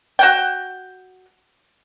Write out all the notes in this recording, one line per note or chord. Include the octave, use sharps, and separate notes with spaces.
F#4 F#5 G5